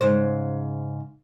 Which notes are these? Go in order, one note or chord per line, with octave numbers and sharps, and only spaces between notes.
G#2 C#3 C5